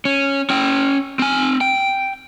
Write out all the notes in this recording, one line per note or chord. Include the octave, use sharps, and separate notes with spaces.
C#4
C#4 G5
C4 G#5
G5